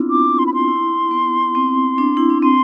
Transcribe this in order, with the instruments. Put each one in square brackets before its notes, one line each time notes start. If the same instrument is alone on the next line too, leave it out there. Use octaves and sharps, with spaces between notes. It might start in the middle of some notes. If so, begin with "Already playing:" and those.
Already playing: [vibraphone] B3 C4 D4 E4 F4
[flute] D6
C6
B5
C6
[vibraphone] E4
B3
C4
D4
E4
D4
[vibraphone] C4 [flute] C6